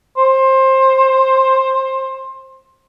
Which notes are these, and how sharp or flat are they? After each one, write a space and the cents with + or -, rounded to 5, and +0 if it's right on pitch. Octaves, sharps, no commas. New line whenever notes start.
C5 +20